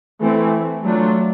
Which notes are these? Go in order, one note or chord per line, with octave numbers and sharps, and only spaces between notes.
E3 A3 C4
F#3 A3 D4 F4